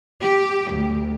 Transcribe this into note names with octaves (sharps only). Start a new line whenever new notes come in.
G4
D2